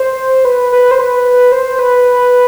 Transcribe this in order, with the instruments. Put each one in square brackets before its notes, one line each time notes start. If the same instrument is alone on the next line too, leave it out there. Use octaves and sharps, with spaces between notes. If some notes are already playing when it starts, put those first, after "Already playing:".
Already playing: [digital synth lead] C5
B4
B4
C5
B4
C5
B4